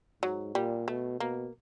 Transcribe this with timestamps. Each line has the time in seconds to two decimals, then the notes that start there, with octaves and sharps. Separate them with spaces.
0.22 G#2 F#3
0.55 A#2 G3
0.88 B2 A3
1.19 B2 A#3